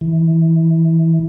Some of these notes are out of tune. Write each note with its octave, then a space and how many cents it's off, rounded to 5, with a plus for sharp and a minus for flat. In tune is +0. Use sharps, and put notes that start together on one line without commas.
E3 -15